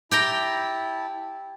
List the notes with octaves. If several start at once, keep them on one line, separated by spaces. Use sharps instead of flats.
E4 G4 G5 A5 A#5